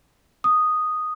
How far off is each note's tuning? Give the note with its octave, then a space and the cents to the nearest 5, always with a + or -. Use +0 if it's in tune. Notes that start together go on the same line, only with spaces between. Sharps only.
D#6 -5